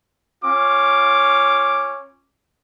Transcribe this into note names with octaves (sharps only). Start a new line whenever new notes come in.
C#4 F4 D6